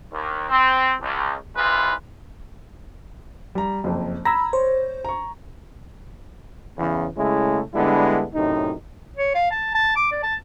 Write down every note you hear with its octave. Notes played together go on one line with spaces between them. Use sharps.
D#2
C4
C#2
B1 G#2 G#3 E4 F4 B4
G3 A#5
F#1 F2
A#5 B5 E6 G#6 A#6
C5 C#5
A#5 C#6
E2 C#3
C#3 G#3 A3 C#4 E4
D3 G3 G#3 B3 D4 E4
F#2 A2 C3 D#4
C#5
F5
A5
A5
D6
D5
A5